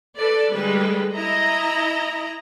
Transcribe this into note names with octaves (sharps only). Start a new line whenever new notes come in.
A4 B4 D5
D3 G3 G#3 B4
E4 D#5 A#5